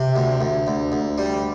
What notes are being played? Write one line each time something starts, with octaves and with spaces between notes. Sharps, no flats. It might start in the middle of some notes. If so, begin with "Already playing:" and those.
Already playing: C3
D2
D2
D2
D2
G3